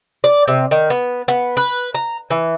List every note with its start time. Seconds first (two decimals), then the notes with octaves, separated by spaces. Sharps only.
0.24 D5
0.48 C3
0.71 D#3
0.90 B3
1.28 B3
1.57 B4
1.94 A#5
2.30 E3